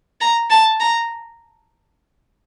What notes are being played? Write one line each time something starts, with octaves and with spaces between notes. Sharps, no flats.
A#5
A5
A#5